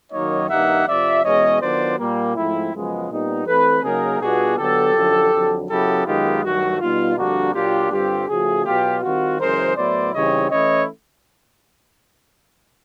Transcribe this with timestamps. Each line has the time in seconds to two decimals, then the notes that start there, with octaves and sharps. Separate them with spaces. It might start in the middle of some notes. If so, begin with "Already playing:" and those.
0.13 F#2 D#3 F#3 A#3 D#4 C#5 D#5
0.50 G2 D#3 G3 A#3 D#4 E5 F#5
0.87 F2 C3 F3 D5 E5
1.24 E2 B2 G#3 C#4 C#5 D#5
1.61 D#3 F#3 B3 D4 F4 C5 D5
1.98 A#2 G3 A#3
2.36 G#2 F3 A3 C4 E4
2.73 F#2 C#3 F3 G#3 B3
3.09 A#2 G3 B3 D#4
3.46 E3 A3 C4 A4 B4
3.83 C#3 F#3 A#3 D#4 G#4 A#4
4.20 B2 G3 B3 D4 F4 F#4 G#4
4.57 D3 F#3 B3 G4 A4
4.95 F#2 D3 F3
5.31 F2 D3 F#3
5.69 F#2 C#3 F#3 B3 E4 G4 A4
6.06 F#2 D#3 G#3 B3 D#4 F4 G4
6.44 G2 D#3 F#3 A3 F#4
6.80 B2 G3 B3 D#4 F4
7.17 F2 D3 G3 A#3 D4 F#4
7.54 A#2 F#3 A#3 D4 F4 G4
7.91 G2 D3 G3 C4 F4 G4
8.28 C#3 F3 A3 F#4 G#4
8.65 B2 F#3 B3 F4 G4
9.02 D#3 G3 C4 F4 F#4
9.39 F#2 C#3 E3 G#3 A#4 C5
9.76 A2 F#3 B3 E4 C5 D5
10.13 C#3 E3 G3 C4 D#4 C#5 D#5
10.51 E3 A3 C#4 E4 C#5 D#5